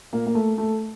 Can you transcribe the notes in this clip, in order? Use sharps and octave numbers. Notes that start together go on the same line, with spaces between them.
A#2 A#3
A#3
A3
A3